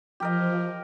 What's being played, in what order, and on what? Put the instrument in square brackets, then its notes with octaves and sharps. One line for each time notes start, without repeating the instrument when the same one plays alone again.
[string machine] F3 [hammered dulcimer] G4 A#4 D#5